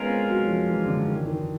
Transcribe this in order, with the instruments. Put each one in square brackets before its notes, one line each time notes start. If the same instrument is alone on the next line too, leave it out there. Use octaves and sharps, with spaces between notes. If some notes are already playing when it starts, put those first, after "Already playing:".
Already playing: [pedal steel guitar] G#3 C#4 F4 A#4 [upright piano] B3
[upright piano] C4
F#3
F3
E3
D3
D#3
D#3